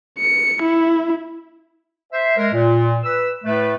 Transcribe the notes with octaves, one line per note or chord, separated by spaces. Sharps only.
C#7
E4
C5 E5
G#3 A#4
A#2
B4 E6
A2 A3 B4